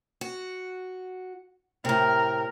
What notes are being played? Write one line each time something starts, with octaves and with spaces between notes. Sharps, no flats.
F#4
A2 C3 A#4